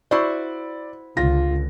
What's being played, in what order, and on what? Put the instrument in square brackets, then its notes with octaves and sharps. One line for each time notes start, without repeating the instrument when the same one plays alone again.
[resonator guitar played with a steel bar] E4 F#4 C5 [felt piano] D5
[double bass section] C#2 D3 [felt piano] F4 A#6